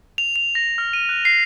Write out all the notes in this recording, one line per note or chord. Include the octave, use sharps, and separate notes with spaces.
F7
F7
A#6
F6
D#7
F#6
C7